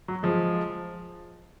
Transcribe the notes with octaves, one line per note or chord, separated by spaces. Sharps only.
F#3
F3 G#3